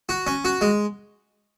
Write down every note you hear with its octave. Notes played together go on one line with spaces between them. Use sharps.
F#4
C#4
F#4
G#3